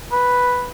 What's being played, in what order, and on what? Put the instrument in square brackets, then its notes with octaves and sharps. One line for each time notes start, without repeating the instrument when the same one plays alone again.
[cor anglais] B4